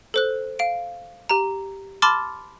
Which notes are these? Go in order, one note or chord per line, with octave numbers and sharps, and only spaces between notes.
A4 C5 F#6
F5 D7
G4 A#5
A5 B5 C6 D6 F6 A6